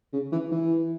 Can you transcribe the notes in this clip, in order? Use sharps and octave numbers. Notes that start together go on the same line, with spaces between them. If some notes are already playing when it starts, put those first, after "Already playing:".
C#3
E3
E3